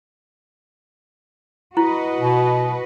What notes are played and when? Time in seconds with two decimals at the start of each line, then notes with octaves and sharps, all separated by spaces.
1.77 E4 F#4 B4 D#5
2.21 B2